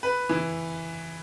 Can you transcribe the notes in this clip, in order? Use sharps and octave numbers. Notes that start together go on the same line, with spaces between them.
B4
E3